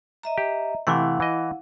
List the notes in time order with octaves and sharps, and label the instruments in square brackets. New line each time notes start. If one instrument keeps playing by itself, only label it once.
[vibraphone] D#5 E5 A#5
[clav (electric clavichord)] G4
[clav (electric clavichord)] C3 E3 A3 [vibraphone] E4 F5 F#5
[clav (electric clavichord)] E3 D#5